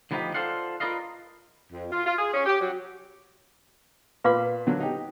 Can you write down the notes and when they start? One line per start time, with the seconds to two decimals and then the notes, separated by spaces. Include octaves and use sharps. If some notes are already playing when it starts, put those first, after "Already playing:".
0.11 D2 F3 G3 B3 D#4 G4
0.34 F4 A4 C5 D5 F5 F#5
0.80 F4 A#4 B4 D5 D#5 F5
1.72 F2
1.91 F4
2.06 F4
2.18 G#4
2.34 C#4
2.46 G4
2.61 F#3
4.24 A#2 B4 F5 B5 D6
4.67 D3 F#3 A#3
4.80 D#4 G4